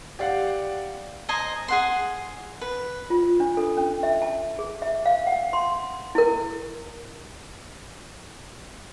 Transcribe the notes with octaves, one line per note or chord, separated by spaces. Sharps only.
G4 D5 F5 F#5
C5 D#5 G#5 A#5
G#4 F#5 C6
B4
F4
D4
A4
C#4
E5
A5
G#4
E5
F5
F#5
C6
E4 A#4